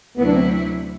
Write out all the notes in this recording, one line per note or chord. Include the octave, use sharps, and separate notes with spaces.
D2 C3 F#3 A3 B3 E4
D4
C4